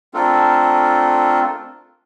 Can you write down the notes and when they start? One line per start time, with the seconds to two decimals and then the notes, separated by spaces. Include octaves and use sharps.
0.14 A3 C4 D4 F4 A4 A#4